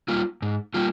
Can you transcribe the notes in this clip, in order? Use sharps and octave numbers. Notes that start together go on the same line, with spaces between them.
G3 A#3 F4
G#2
G3 A#3 F4